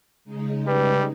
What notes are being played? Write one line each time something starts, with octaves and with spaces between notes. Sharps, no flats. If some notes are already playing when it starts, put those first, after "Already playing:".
C#3 G#3 D#4
G3 B4